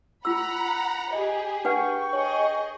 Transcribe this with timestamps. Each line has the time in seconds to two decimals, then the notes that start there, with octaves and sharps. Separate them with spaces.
0.25 F4 F#5 A#5 B5 E6
1.13 G4 G#4 D#5
1.65 D4 B4 F#5 G5 C#6
2.13 G#4 C#5 D#5